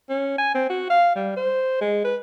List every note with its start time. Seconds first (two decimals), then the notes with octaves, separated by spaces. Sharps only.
0.10 C#4
0.38 G#5
0.55 C4
0.70 F#4
0.90 F5
1.16 G3
1.37 C5
1.81 G#3
2.05 B4